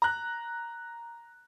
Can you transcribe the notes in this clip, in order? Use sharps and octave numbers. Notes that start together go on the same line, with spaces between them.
A#5 F#6